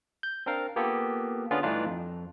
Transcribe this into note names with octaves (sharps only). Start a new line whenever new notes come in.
G6
C4 D4 A#4 F5
A#3 B3 F4 G4 A4
D3 B3 C#4 D4 F4 G#4
G2 E3 A3 D4 D#4 F4
F2